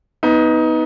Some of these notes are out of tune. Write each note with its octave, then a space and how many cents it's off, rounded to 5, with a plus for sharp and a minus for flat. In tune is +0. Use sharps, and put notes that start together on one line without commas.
B3 +0 D#4 +20